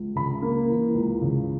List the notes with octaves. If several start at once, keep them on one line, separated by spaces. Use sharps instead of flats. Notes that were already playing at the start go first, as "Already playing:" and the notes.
Already playing: C#2
C#3 B5
A#3
E3
C#2
C#3